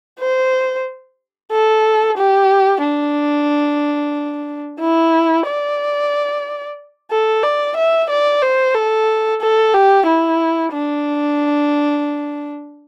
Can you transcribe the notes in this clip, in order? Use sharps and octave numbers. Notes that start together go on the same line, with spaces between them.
C5
A4
G4
D4
E4
D5
A4
D5
E5
D5
C5
A4
A4
G4
E4
D4